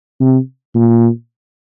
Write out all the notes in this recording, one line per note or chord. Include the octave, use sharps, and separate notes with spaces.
C3
A#2